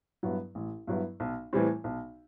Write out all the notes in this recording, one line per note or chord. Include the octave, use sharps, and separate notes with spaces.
G2 F#3 B3 E4
A1
G2 F#3 B3 E4
B1
A2 E3 G3 C4
B1